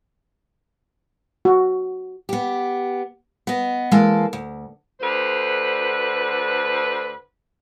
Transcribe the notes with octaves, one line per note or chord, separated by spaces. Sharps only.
F#4
B3 G4
B3 D#5
E3 G#3 A#3 A4 A5
D2
D2 D3 B4 C5